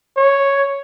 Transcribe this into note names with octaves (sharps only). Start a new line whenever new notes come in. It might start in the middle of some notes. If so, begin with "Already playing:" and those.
C#5